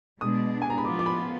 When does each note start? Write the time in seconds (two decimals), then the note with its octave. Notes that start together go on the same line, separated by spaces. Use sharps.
0.21 B2 G#3 D4 D#6
0.62 G#5
0.70 A#5
0.78 B5
0.85 F3 B3 F4 D6
0.99 D6
1.06 B5